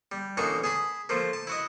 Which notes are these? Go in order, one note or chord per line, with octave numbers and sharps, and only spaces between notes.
G3
A1 B2 A#3 D4 D#4 C#6
G#4 A5 B5
F3 A3 A#3
A5
E4 F#4 D#5